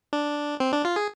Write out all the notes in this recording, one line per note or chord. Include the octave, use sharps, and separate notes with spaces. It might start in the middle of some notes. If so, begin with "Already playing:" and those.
D4
C4
D4
F4
G#4